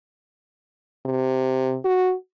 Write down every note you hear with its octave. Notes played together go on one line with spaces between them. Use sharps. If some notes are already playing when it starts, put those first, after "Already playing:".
C3
F#4